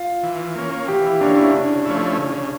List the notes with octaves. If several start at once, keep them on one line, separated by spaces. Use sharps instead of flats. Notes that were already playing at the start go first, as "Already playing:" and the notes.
Already playing: F4
E3
A#3 C#4
E3 G4
E4
A#3 C#4 D4
E4
C#3 D4
F3 A3 C#4 E4
C#3